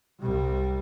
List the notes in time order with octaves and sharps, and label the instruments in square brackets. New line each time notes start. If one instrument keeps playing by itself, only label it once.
[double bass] C2 G3